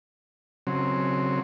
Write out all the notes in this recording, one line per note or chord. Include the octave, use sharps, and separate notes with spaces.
C#3 F#3 C4